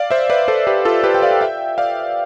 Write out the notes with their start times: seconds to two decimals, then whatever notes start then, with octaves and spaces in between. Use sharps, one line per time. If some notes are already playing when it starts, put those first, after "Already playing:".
Already playing: D5 F5
0.11 C5 E5
0.30 B4 D5
0.48 A4 C5
0.67 G4 B4
0.85 F4 A4
1.04 G4 B4
1.14 G5
1.22 D5 F5
1.41 E5 G5
1.78 D5 F5